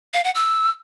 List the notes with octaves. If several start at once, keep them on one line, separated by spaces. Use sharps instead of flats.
F5
F#5
E6